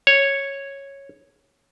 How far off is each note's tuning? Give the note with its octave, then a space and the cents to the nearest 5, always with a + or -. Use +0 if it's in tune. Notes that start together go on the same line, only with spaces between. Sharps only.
C#5 -5